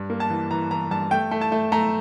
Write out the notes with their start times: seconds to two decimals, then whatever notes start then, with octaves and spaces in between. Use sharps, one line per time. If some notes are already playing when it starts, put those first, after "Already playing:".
Already playing: G2
0.10 A#3
0.20 A5
0.30 E3
0.51 E3 A#5
0.71 E3 A#5
0.91 G2 A5
1.11 A3 G5
1.31 A3
1.41 A5
1.52 A3
1.72 A3 A#5